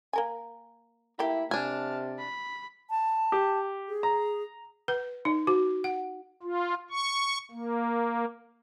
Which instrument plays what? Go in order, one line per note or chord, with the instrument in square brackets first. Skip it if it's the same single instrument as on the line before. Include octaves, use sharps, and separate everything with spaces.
[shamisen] A#3 A#4 G#5
[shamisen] A3 A#3 G4 [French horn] E4 [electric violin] B5
[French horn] C3 [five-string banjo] D4 G#5 [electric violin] A5 F6
[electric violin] B5
[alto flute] A5
[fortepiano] G4
[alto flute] G#4
[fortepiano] A#5
[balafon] B4
D#4
F#4
F#5
[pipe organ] F4
C#6
A#3